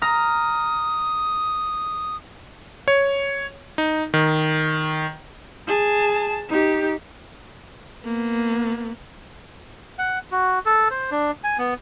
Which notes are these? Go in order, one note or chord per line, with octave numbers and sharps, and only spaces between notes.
A#5 D#6 F6
C#5
D#4
D#3
G#4 A5
D#4 G4
A#3 B3
F#5
F#4
A4
C5
D4
G#5
B3